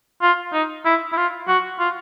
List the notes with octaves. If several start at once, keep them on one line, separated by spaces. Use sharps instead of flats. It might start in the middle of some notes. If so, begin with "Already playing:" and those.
F4
D#4
E4
E4
F4
F#4
F4